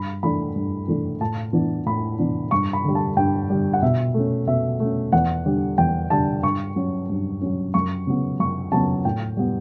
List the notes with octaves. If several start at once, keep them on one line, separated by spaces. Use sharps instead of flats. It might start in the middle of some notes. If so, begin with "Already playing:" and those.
Already playing: G2 B5
E3 A3 D4 B5
G2
E3 A3 D4
A2 A5
E3 B3 D4
A2 B5
E3 B3 D4
G2 C#6
B5
D3 G3
A5
G2 G5
D3 G3
F#5
B2 E5
A3 C#4
B2 E5
A3 C#4
E2 F#5
D3 G3 D4
E2 G5
D3 G3 D4 A5
G2 C#6
F#3 C#4
G2
F#3 C#4
F#2 C#6
C#3 F#3 B3
F#2 C#6
C#3 F#3 B3 A5
A2 G5
G3 B3